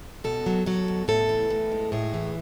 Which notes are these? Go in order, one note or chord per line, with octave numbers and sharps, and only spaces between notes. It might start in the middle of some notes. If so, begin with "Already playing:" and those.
B2 A4
F#3
F#3 A4
B2
A2 A4
E3
A2
G#3
A2 G#4
E3